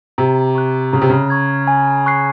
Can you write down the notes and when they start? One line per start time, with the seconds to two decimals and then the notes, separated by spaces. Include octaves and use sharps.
0.18 C3 A#5
0.55 C#6 F#6
0.93 C#3 A#5
1.01 C3
1.10 C#3
1.30 C#6 G#6
1.67 G#5
2.06 C#6 F#6 C7